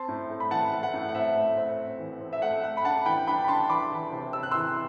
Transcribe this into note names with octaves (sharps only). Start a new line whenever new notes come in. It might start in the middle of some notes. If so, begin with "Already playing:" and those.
Already playing: C4 A5 C6
A2
A3
B5
E3 F#5 A5
A3
F#5
A2
F#5
C4 E5
A3
C4
C4
E3
C4
E5
A3 F#5
A3 F#5
B5
D4 F#5 A5
E3 G5 B5
D4 G5 B5
B5
D4 A5 C6
E3 B5 D6
E3
C3
C3 E6
F#6
E3 C6 E6